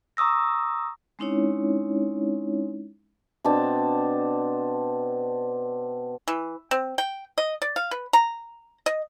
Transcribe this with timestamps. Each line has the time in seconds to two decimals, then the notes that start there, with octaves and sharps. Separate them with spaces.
0.17 A#5 C#6 D#6 E6 A#6
1.19 G#3 C4 C#4 D#4 E4 C#5
3.44 B2 C4 D4 A5
6.28 E3
6.71 C4
6.98 G5
7.38 D#5
7.62 D5
7.76 F5
7.91 B4
8.13 A#5
8.86 D#5